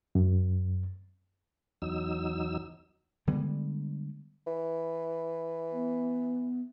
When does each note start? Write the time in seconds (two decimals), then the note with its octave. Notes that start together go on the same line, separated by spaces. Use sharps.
0.15 F#2
1.82 E2 F#3 D#4 E6
3.27 D3 G3 G#3 B3
4.47 E3
5.72 B3